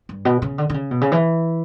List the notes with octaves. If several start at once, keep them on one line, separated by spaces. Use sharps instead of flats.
G2
B2
C#3
D3
D3
C#3
B2
C#3
E3